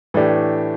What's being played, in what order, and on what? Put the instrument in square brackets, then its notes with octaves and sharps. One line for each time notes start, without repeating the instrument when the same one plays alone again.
[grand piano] A2 E3 A3 D4 G4